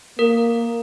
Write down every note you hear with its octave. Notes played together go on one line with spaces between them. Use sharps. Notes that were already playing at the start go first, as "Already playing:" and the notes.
A#3 A#4